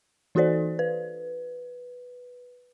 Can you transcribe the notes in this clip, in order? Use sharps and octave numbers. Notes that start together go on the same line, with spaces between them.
E3 D#4 F#4 A4 C5 D5
B4